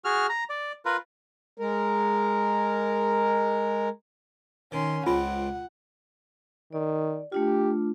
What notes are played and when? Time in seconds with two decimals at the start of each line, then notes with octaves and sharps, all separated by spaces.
0.05 F#4 G#4 F6
0.29 A#5
0.50 D5
0.85 F4 A#4 B4
1.58 G#3 A#4
4.72 D#3 C#4 C6
5.07 C#2 C4 F4 F#5
6.73 D#3 D5
7.32 A3 D4 F4 G4